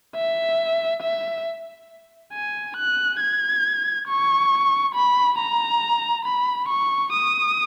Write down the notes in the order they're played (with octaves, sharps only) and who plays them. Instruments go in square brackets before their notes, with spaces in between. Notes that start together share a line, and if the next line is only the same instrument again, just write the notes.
[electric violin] E5
E5
G#5
F#6
G#6
C#6
B5
A#5
B5
C#6
D#6